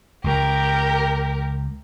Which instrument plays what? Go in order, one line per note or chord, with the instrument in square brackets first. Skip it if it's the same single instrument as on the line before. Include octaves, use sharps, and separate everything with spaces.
[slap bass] C#2 [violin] G4 A#4